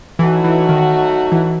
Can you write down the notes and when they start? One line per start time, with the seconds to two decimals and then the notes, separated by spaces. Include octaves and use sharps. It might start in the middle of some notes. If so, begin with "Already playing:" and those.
0.19 E3 F#3 A3 D#4 F#4
0.44 E3
0.69 D#3
1.32 E3